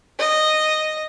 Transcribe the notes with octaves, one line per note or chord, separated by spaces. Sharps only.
D#5